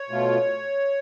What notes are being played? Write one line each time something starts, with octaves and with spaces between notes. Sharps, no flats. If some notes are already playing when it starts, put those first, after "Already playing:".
Already playing: C#5
B2 A3 F4